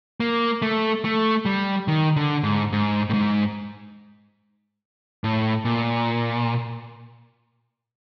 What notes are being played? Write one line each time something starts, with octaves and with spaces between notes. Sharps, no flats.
A#3
A3
A3
G3
D#3
D3
G#2
G#2
A2
G#2
A2
A#2